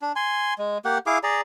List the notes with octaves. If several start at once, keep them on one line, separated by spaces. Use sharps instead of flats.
D4
G#5 C6
G#3
A#3 G4 F#5
E4 G#4 F5 D6
G#4 D5 A#5